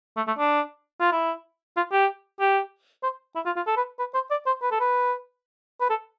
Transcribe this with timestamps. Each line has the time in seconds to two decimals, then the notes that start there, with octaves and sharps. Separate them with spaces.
0.17 A3
0.27 A3
0.38 D4
1.00 F4
1.12 E4
1.77 F4
1.92 G4
2.40 G4
3.03 C5
3.36 E4
3.46 F4
3.56 F4
3.67 A4
3.77 B4
3.99 B4
4.14 C5
4.31 D5
4.47 C5
4.62 B4
4.71 A4
4.80 B4
5.81 B4
5.90 A4